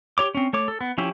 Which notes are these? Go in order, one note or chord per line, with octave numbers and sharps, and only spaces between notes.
G4 C#5 D6
C4 C#4
A3 C#5 D6
A4
B3
F3 C#4 E4 G4